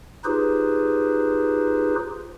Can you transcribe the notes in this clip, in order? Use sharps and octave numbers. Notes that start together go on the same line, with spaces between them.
D#4 F4 G4 G#4 B4 C5